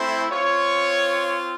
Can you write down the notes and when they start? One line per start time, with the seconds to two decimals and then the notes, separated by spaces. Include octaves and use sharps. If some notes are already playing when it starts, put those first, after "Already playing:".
Already playing: A3 C4 E4 C5
0.30 C4 F4 C#5